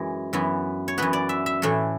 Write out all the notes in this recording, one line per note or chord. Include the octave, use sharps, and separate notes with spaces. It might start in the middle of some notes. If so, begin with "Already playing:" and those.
Already playing: F#2 E3 G#3
F#2 E3 B3
C#5
F#2 E3 B3 B4
D5
E5
E5
A2 E3 A3